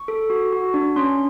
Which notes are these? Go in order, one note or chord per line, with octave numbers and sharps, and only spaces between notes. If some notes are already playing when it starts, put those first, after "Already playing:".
Already playing: C#6
A4
F#4
F#4
D4
C#4 C6